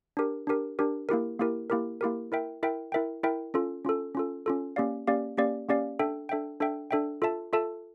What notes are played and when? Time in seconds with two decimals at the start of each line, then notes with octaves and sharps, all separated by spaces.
0.17 D4 G4 A#4
0.47 D4 G4 A#4
0.79 D4 G4 A#4
1.09 A#3 E4 G4 A#4
1.40 A#3 E4 G4 A#4
1.70 A#3 E4 G4 A#4
2.01 A#3 E4 G4 A#4
2.32 E4 A#4 E5 G5
2.63 E4 A#4 E5 G5
2.92 E4 A#4 E5 G5
3.23 E4 A#4 E5 G5
3.54 C#4 F4 A4
3.85 C#4 F4 A4
4.15 C#4 F4 A4
4.46 C#4 F4 A4
4.76 A#3 C#4 G4 D5 F5
5.07 A#3 C#4 G4 D5 F5
5.37 A#3 C#4 G4 D5 F5
5.69 A#3 C#4 G4 D5 F5
5.99 D4 A4 E5 G5
6.29 D4 A4 E5 G5
6.60 D4 A4 E5 G5
6.91 D4 A4 E5 G5
7.22 F4 A4 E5 A5
7.53 F4 A4 E5 A5